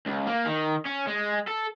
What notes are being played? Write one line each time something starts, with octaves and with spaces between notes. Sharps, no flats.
C#2
A#3
D#3
C#4
G#3
A4